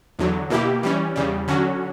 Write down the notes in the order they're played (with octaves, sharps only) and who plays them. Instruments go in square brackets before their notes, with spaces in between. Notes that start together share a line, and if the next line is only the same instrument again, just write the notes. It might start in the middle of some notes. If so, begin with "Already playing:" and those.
[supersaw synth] E2 D3 F#3
B2 A#3 E4 G4
E3 G3 C#4
E2 C#3 G3
D3 F#3 C#4 F#4